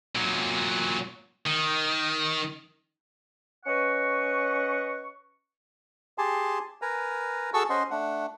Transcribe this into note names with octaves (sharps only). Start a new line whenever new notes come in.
A#2 F#3
D#3
C#4 B4 D#5 F#5 C#6
G4 G#4 G#5 A5 C6
A#4 B4 G#5 A#5
F#4 G#4 A4 A5 C#6 E6
C#4 C5 D#5 F#5 C6
A3 D4 F#5